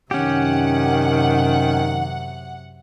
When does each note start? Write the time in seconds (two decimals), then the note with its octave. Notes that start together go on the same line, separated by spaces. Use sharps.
0.11 F#2 C3 D#3 C#4 G4 F#5